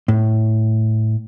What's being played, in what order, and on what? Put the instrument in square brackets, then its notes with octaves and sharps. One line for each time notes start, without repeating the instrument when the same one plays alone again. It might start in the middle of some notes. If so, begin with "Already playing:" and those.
[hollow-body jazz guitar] A2